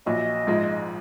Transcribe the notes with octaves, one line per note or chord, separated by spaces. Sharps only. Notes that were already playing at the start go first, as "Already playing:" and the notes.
A#1 A#2 F#3 D#5
A#1 G#2 F3 G#3